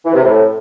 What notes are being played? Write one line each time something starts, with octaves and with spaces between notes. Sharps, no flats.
E3
C3
A2